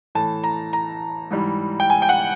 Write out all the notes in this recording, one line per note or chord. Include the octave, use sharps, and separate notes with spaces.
A2 E3 A3 A5
A#5
A#5
G#2 E3 G3
G5
G#5
G5
F#5